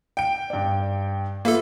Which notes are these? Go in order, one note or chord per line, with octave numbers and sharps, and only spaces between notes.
G5 D7
G2 D5
A#3 F4 A4 B4 E5